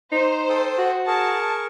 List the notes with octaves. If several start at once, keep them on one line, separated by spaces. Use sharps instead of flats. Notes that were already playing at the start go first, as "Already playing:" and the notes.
D#4 C5
A4 G5 D#6
F#4
G#4 A#4 A5 C#6